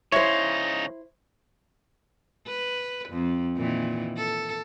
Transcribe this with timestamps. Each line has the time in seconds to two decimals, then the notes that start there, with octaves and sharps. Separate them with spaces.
0.12 C#3 D#4 E4 C5 C#5
2.46 B4
3.10 F2
3.56 A#2 D#3 E3
4.17 A4